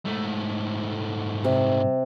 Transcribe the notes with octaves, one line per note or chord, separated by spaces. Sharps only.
G#2 A3
C3